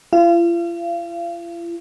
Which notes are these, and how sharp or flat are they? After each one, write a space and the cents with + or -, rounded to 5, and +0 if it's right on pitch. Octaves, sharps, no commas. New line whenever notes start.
F4 -45 F5 -35